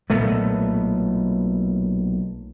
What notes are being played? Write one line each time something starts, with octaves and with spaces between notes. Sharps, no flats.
B1 A#2 A3 B3